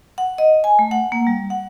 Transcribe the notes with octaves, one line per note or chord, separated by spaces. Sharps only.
F#5
D#5
G#5
A3
F#5
A#3
G3
F#5